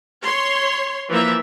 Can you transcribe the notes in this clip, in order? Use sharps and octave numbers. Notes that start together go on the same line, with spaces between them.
C#5 C6
E3 F3 A#3 E5